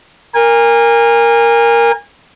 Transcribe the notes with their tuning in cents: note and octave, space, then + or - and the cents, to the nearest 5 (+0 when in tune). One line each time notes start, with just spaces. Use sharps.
A#4 +0 G#5 -30